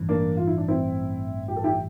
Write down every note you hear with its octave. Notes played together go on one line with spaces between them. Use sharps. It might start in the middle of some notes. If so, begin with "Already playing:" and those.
Already playing: A1 G2 E3
A#3 D4
F4
E4
D4
C4 E4
G4
A4
E4 G4